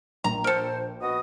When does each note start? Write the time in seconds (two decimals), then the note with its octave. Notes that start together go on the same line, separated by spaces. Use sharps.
0.24 A#1 A#5
0.44 A4 A#4 C5
1.01 B3 F#4 D#5 D#6